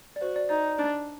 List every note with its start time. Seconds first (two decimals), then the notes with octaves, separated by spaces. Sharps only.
0.16 D5
0.21 F#4 C5
0.36 D5
0.49 D#4 D5
0.79 D4